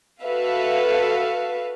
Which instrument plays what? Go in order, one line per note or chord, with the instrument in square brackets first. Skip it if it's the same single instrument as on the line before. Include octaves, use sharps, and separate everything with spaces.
[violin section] F#4 A4 B4 E5 F5